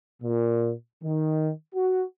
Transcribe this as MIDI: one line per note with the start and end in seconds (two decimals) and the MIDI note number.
0.22 0.71 46
1.02 1.50 51
1.73 2.04 66